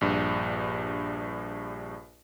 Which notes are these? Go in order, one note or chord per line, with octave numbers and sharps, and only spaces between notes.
A#1 G2